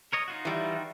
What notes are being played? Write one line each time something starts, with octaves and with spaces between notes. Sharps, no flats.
A#4 C#5 D#5
D#4 F4 F#4
E3 G3